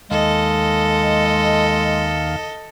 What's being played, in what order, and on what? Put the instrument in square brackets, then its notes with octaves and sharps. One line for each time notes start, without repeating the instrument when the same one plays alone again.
[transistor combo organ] D#2 F5 [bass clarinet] G#3 [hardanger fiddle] A4 D#5